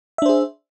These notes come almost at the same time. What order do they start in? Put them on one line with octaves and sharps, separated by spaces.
E5 D4 C5 G#4